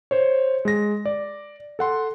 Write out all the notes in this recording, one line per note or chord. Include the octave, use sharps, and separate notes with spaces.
C5 C#5
G#3 A#6
D5
A4 F#5 C6